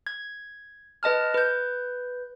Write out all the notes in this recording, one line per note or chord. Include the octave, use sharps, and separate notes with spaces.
G#6
B4 D#5 A5 F6
B4 G6